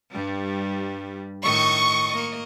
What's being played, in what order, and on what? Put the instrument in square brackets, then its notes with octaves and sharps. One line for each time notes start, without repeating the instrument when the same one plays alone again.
[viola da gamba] G2 G3
[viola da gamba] A2 D#3 D#5 [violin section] C#6
[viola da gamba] A#3 D#5